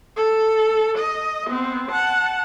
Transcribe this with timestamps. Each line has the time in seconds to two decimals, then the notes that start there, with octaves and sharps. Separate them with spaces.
0.16 A4
0.98 D#5
1.47 B3 C4
1.91 F#5 A5